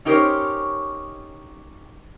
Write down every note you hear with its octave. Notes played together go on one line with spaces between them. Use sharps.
C#4 D#4 G4 A#4 C5 C#5